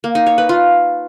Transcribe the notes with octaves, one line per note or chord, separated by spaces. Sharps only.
A#3
D#4
C#5
B4
F4